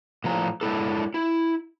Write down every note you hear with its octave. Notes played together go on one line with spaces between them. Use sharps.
A2 F3 A#5
G#3 D4 E4 A4
E4